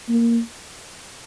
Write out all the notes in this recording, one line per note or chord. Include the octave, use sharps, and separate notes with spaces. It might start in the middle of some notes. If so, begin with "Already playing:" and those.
A#3